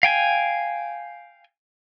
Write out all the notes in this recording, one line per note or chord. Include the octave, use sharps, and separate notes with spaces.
F5 G5 G#5